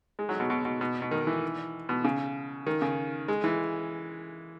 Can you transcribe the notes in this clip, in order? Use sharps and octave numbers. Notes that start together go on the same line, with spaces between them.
G#3
F#3
B2
B2
B2
B2
B2
D#3
E3
B2
C#3
D#3
C#3
G#3
E3